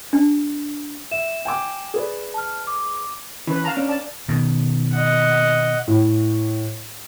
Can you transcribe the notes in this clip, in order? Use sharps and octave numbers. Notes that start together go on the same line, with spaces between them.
D4
E5 E7
G5 G#5 D6
G#4 B4 D5
A5 F6
D6
E3 C#4 B4
F5 A5 A#5
C#4 D4
D5 A5
B2 D#3
D#5 F#5
A2